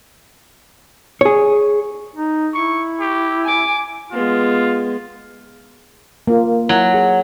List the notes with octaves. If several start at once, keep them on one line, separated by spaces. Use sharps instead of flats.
G#4 C#5
D#4
E4 C#6
G4
G#5 D6
G#3 B3 F4
A#3 F4
F#3 E4
G#4